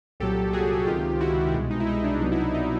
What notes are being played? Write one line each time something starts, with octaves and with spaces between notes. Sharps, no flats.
C2 A#2 F#3 G4 A4
F#4 G#4
C#2 C3 D#3 F4 G4
E4 F#4
C2 B2 G#3
D#4
E4
D#4
D4
C2 B2 F#3 B3 D4 D#4
E4
D#4
D#4